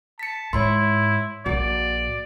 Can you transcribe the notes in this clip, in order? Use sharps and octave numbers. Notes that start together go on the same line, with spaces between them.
A5 B6 C#7
G#2 E4 C#5 B5 C6
A#1 A#2 F#4 D5